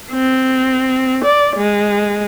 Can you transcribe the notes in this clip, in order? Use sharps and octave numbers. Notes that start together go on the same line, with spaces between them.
C4
D5
G#3